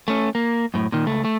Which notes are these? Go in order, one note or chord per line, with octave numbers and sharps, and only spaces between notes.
A3 C#4
A#3
F#2 A2
A#2 D#3
C#2 A3
A3